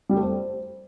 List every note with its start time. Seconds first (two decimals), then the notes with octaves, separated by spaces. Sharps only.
0.09 G3
0.16 A3
0.23 C5